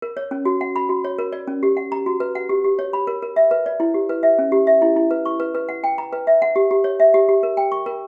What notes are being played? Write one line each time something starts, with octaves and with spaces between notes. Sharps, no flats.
A#4
C#5
C#4
F#4
F#5
B5
F#4
C#5
A#4
D5
C#4
G4
F#5
A#5
F#4
B4
F#5
G4
G4
C#5
B5
A#4
A#4
E5
B4
D5
E4
G4
B4
E5
C#4
G4
E5
E4
E4
B4
C#6
B4
B4
F#5
G5
A#5
B4
E5
F#5
G4
G4
C#5
E5
G4
G4
A#4
G5
C#6
A#4